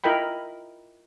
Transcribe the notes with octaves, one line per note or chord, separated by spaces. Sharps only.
E4 F4 A#4 D#5 G5 B5